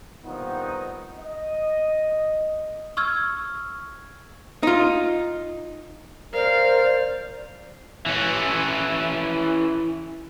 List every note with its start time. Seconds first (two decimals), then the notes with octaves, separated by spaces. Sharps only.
0.24 G2 A#2 D#3 B3 C4 D#4
1.19 D#5
2.97 C#6 E6 F6 G#6
4.63 D#4 F4
6.34 A#4 C5 D5 F5
8.06 E3 C#4